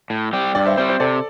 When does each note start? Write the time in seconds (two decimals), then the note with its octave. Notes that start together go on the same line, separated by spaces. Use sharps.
0.10 A2
0.33 G3 C4 G4
0.55 G2 D5 G5
0.66 C5 E5
0.77 G3 C4 C5
0.89 C5
1.00 C3 A4 D5